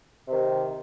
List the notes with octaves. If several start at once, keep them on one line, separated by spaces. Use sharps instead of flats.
C3 D#3